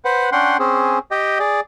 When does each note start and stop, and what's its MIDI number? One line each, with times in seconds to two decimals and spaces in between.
0.05 0.30 71
0.05 0.30 72
0.05 0.30 78
0.32 0.57 61
0.32 0.57 62
0.32 0.57 78
0.32 0.57 79
0.32 0.57 84
0.59 0.99 60
0.59 0.99 61
0.59 0.99 68
1.11 1.38 67
1.11 1.38 75
1.11 1.38 79
1.39 1.60 68
1.39 1.60 74